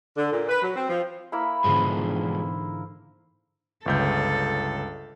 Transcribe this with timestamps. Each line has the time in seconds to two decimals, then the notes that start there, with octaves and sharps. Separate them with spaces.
0.17 D3
0.31 A#2
0.49 B4
0.62 F#3
0.76 C4
0.89 F3
1.32 A#3 E4 B5
1.64 G#2 B2 D3 E3 F3 G#3 C5
3.86 G1 C#2 A4 G6